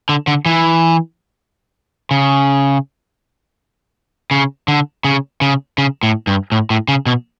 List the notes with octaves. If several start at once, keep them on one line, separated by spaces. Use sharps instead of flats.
D3
D3
E3
C#3
C#3
D3
C#3
C#3
C#3
A2
G2
A2
A2
C#3
B2